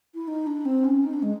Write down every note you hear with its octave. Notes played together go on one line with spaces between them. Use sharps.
E4
D#4
D4
C4
C#4
D#4
D4
G#3